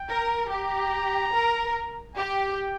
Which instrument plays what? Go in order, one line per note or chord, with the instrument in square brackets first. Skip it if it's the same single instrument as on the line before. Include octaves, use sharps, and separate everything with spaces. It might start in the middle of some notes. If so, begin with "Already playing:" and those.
Already playing: [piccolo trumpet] G5
[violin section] A#4
[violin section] G4 [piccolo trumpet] A#5
[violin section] A#4
[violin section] G4 [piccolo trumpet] G5